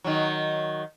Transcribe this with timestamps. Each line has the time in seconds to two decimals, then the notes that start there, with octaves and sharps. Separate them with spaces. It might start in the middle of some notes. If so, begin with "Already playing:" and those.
0.04 D#3 F#3